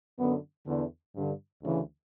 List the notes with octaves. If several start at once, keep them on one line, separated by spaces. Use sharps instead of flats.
F#2 D3 B3
E2 D3
G2 D3
D2 C#3 E3